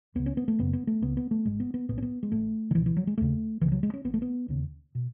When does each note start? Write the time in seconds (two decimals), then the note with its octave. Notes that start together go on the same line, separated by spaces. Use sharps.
0.15 C#2 C#3 B3
0.26 C#4
0.37 B3
0.48 A3
0.59 F#1 F#2 C#3 B3
0.73 B3
0.87 A3
1.01 C#2 C#3 B3
1.17 B3
1.31 A3
1.45 G#1 G#2 G#3
1.60 B3
1.74 B3
1.89 B1 A2 B3
1.98 C#4
2.02 B3
2.23 G#3
2.32 A1 A2 A3
2.71 D#3
2.75 C#2 B2 E3
2.86 E3
2.97 F#3
3.07 G#3
3.18 E1 D#2 C#3 A3
3.61 C#2 C#3 E3
3.72 F#3
3.83 G#3
3.94 C#4
4.04 A1 A2 B3
4.14 A3
4.22 B3
4.48 E1 D#2 C#3
4.95 B2